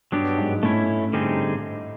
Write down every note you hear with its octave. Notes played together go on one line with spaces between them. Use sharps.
G2 F#3 B3 D4 G4
G#2
A2 A3 C#4 E4
D3 G3 C4 D#4 G#4